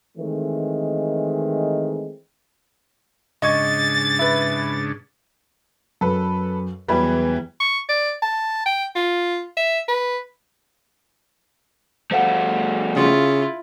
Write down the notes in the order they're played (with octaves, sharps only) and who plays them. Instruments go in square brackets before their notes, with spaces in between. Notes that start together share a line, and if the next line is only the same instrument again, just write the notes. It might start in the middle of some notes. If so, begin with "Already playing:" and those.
[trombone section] D#3 E3 G#3 A3 C4
[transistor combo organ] G#2 C#3 D4 [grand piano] D#5 C#6 G#6 [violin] A6
[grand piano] E4 B4
[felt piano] F#2 [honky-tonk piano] A4 B4
[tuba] E2 [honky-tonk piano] E3 F#3 G3 [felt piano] B5
[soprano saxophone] C#6
D5
A5
G5
F4
E5
B4
[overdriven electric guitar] G3 A3 [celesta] C5 F5 F#5
[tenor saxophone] C#3 [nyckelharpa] E4 F4